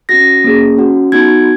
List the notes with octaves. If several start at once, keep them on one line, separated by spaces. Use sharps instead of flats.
C#4 F#4 A#6
A#3 C#4 G#4
C#4 F#4
B3 D#4 F#4 G#6